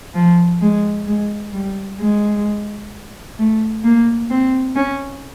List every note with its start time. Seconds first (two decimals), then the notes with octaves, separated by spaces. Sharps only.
0.14 F3
0.61 G#3
1.07 G#3
1.53 G3
1.99 G#3
3.38 A3
3.84 A#3
4.30 C4
4.76 C#4